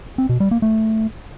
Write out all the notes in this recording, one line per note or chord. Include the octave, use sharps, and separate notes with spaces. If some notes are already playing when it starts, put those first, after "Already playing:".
C4
B2
G3
A#3
A3